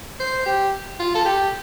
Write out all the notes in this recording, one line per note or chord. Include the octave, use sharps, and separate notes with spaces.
C5
G4
F4
A4
G4